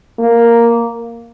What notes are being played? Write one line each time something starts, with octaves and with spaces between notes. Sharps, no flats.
A#3